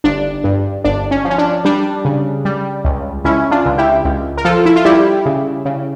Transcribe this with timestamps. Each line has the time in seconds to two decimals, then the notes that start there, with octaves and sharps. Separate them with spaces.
0.04 G1 D4
0.44 G2
0.84 G1 D4
1.11 C#4
1.25 F3
1.30 C#4
1.38 D4
1.65 G3 D4
2.05 C#3
2.45 G3
2.85 C#2
3.25 C#2 C#4 E4
3.51 D4 F4
3.65 C#2
3.78 E4 G4
4.05 C#2
4.38 A#4
4.45 F3 F4 A4
4.66 E4
4.76 F4
4.85 G3 E4 G4
5.26 C#3
5.65 C#3